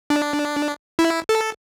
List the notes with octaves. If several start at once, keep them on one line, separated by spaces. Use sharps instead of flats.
D4
E4
A4